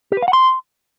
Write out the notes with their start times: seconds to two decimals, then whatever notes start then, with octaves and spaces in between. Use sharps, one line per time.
0.12 G4
0.17 B4
0.22 F5
0.28 F#5
0.33 C6